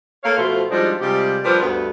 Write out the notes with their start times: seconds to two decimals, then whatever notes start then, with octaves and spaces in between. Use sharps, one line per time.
0.24 A3 A#3 A4 C#5 F5
0.37 B2 F3 A3 F4 C5 F5
0.70 F3 G3 G#3 D4 D#4 F#4
1.00 C3 G3 G#3 F4 G4
1.44 F3 G3 D4 G4 A#4 B4
1.62 D2 G2 D3 B3